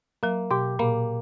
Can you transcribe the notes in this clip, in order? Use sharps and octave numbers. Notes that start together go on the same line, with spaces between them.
F#3 A#3
B2 G4
A#2 A#3